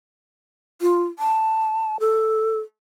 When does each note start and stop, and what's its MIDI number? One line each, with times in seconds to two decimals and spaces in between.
0.81 1.05 65
1.19 1.99 81
2.00 2.59 69